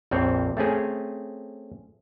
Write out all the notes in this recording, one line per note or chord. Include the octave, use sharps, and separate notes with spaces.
A#1 F2 C4 C#5
A3 C4 C#4 G#4